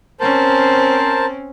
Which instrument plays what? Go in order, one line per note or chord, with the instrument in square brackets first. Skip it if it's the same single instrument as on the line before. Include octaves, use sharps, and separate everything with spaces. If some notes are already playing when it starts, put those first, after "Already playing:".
[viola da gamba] C4 C#4 [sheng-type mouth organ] A#4 C5 A5